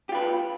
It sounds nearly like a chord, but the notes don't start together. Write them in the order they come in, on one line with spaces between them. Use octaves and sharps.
G4 F4 B4